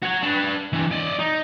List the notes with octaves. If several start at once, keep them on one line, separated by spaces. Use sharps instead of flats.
F#4 C#5
D4 B4
E3 D4
D5 D#5
D#4